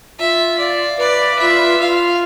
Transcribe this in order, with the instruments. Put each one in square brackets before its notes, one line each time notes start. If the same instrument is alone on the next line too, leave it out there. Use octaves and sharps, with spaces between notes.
[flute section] F4 [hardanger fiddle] E5
[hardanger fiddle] D5 [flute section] F5
[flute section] B4 [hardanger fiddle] D5
[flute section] F4 [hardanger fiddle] E5
[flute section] F4 [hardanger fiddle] F5